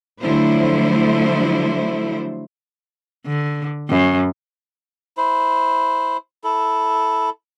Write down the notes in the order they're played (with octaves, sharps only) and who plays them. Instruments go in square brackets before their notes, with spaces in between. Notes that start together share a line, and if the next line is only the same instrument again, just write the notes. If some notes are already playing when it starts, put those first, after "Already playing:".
[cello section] D3 F3 F#3 A3 E4 C5
[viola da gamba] D3
F#2
[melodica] E4 C5
E4 A4